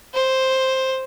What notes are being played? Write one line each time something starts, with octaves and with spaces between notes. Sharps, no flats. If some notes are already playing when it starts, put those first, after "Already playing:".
C5